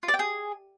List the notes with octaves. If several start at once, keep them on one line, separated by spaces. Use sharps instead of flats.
F4
D5
G5
G#4